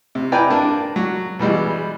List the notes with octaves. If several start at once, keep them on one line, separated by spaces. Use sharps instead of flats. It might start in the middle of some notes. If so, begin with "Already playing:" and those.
C3
E4 B4 D5 G5 G#5 A#5
A#3 D4 A5
F#3
B2 E3 G3 G#3